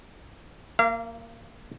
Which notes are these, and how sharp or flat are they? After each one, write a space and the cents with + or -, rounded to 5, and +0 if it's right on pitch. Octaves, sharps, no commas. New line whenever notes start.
A#3 -10 F5 -40